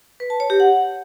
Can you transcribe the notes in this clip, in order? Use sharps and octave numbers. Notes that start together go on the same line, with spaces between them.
B4
A5
C#5
G4
F#5